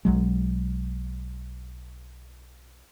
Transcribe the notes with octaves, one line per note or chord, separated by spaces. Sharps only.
B1 F#3 G#3